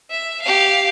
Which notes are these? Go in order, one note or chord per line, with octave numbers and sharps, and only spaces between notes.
E5
G4 F5